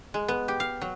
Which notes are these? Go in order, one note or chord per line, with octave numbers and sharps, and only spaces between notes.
G#3
B3
G4
F5
F#3